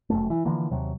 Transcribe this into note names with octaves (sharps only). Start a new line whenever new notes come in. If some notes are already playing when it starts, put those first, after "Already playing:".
F1 F#2 A3
E3
D3 E3 F3 A#3
D#2 C3 F#3